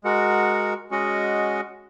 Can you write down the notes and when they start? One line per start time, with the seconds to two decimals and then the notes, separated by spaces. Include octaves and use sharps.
0.04 G#3 F#4 A#4 F#5
0.91 G#3 C#4 F#4 D#5 F#5